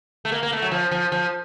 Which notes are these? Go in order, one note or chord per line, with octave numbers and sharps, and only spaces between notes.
A3
A#3
A#3
A3
F#3
F3
F3
F3